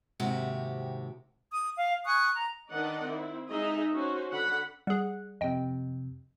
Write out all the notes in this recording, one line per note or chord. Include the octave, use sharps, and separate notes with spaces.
D#2 G#2 C3 F#4 G4 E5
D#6
F5
G#5 C#6 D#6 F#6
A#5
D#3 D4 B4 D5 D#5 F#5
C4 E4
G#3 D#4 G#4 D#5 E5
C#4 F#4 C5
D3 F#5 B5
G3 G#4 F#5
F2 C3 D#5 G5